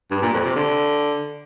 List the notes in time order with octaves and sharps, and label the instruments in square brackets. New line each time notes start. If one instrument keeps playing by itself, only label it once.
[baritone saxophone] G2
A#2
F2
C3
D3